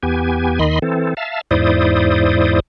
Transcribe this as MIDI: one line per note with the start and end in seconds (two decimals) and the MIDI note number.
0.03 0.59 40
0.03 0.59 59
0.03 0.59 67
0.03 0.59 80
0.59 0.79 39
0.59 0.79 51
0.59 0.79 75
0.59 0.79 83
0.59 0.79 84
0.82 1.14 52
0.82 1.14 60
0.82 1.14 69
1.17 1.41 76
1.17 1.41 77
1.17 1.41 81
1.51 2.60 40
1.51 2.60 44
1.51 2.60 64
1.51 2.60 72
1.51 2.60 74
1.51 2.60 87